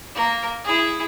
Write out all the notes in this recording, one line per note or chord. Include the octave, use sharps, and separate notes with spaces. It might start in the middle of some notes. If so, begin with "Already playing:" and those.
A#3 A#4
E4 G#4